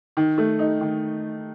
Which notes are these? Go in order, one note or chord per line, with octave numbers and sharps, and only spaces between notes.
D#3
A3
D#4
D#3